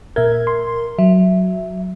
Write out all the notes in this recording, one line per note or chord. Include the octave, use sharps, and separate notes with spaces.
A#2 A#4 E5 G#6
C6
F#3 E5